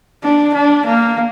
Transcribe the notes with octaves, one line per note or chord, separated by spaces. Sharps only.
D4
D4
A#3